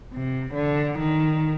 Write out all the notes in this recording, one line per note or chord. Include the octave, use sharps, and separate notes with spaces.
C3
D3
D#3